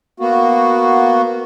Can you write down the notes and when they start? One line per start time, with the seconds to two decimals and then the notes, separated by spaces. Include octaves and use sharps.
0.20 A#3 B3 F#4